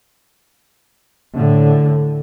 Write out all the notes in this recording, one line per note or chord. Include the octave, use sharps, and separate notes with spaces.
A2 D3